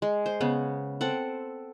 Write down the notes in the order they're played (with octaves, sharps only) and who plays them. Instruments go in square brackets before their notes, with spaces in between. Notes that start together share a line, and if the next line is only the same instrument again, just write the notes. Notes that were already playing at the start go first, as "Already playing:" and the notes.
[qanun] G#3
C5
C#3 B3
C4 A4 F#5